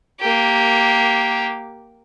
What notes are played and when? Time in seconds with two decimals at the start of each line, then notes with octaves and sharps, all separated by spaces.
0.20 A#3 G4